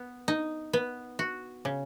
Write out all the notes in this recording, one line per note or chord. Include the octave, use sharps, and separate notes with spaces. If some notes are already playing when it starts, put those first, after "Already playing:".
Already playing: B3
D#4
B3
F#4
C#3